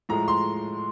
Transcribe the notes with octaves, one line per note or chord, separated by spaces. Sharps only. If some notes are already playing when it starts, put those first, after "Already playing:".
A2 F3 G#3 A#5
C6